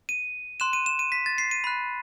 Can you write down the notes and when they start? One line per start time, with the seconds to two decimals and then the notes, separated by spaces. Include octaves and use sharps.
0.09 D#7
0.60 C6 F#6 E7
0.73 D#7
0.86 E7
0.99 D#7
1.12 B6
1.26 A6
1.38 C7
1.51 D#7
1.64 B5 F#6